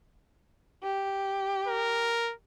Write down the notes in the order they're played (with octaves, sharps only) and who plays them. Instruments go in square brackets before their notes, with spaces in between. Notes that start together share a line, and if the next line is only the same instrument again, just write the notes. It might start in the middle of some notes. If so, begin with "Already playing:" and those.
[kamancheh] G4
[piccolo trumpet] A#4